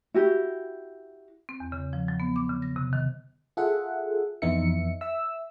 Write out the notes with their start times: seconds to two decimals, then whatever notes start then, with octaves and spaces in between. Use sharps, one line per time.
0.14 E4 F#4 G4
1.49 C4
1.60 E2
1.72 C#3
1.93 F3
2.08 F#3
2.20 B3
2.36 D6
2.50 C#3
2.62 A#6
2.76 C3
2.93 D#3
3.57 F4 G#4 A4 E5 F#5
4.42 F2 E3 B3 D#4 E5 C#7
5.01 E5 E6